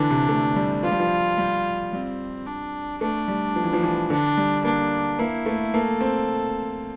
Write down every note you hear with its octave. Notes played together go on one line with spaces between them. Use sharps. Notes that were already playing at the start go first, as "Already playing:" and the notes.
Already playing: D3 E3 D4
C3
A3
G3
F3 F4
G3
F3
G3
G3 C4
D4
A3 D4
G3
F3
E3
F3
E3
D3 D4
G3
A#3 D4
A#3 E4
A3
A#3 A4
C4